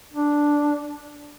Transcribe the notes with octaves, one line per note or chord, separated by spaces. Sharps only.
D4